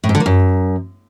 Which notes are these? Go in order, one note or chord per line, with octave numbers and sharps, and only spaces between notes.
A2
G#2
D3
A#3
F#2